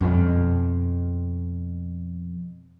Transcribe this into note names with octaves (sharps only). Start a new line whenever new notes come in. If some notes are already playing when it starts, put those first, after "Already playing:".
F2 B2